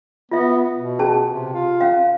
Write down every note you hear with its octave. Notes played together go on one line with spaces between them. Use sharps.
B3 F4 E5
B2
C#4 G#4 A5
C3
F4
C#4 F5